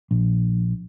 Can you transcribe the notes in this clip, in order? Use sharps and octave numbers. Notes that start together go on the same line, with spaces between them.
A#1